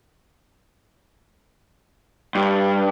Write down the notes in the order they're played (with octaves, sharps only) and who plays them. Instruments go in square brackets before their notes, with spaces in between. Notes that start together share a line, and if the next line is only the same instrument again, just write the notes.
[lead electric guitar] G2